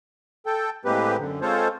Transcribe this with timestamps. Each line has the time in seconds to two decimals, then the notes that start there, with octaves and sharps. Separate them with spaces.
0.46 A4 G5
0.85 A2 G#3 A#3 C4 G4 B4
1.19 F#2 D3
1.41 G#3 C4 F4 A4 C5 C#5